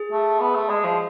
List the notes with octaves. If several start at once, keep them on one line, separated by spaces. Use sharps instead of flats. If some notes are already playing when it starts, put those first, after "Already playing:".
Already playing: G#4
A3
B3
A3
G#3
F3